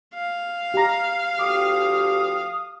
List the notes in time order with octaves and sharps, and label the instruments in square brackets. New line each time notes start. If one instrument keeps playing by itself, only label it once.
[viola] F5
[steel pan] G4 A#5
[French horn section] D2 F3 G4 [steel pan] D6 [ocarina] D#6